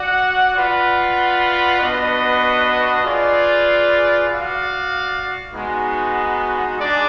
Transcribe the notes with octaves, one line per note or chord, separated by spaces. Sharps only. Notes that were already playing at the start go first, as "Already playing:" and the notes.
Already playing: F#4 D5 F#5
F4 B4 D5 F#5
B3 D4 F#4 B4 D#5
F4 G#4 B4 D5
F#4 D5 F5
G#3 B3 D#4 F#4
G#3 D4 G#4 D5